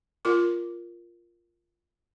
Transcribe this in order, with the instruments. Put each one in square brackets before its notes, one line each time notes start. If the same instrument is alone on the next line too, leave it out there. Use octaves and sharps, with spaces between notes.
[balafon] F4 A#4 D6